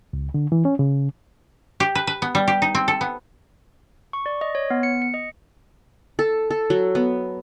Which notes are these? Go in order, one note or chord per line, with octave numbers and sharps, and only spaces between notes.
C#2
D3
E3
C#4
C#3
G4
B4
B4
B3
G3
G4
D#4
C4
A4
B3
C#6
D5
D#5
C#5
B3
C#7
C#7
D#5
A4
A4
F#3
B3